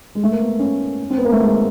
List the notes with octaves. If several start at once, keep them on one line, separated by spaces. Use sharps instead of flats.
G#3
A3
A#3
B3
C#4
C4
B3
A#3
A3
G#3